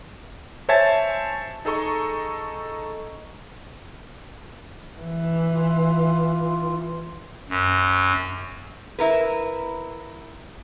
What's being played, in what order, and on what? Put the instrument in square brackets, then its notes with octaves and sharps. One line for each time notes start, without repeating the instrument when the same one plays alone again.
[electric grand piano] C5 C#5 E5 G#5 A5 A6
D#4 G#4 A4 D#5 A#5 C#6
[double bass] E3
[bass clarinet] F4
[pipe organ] F#2
[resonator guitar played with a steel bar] E4 A#4 B4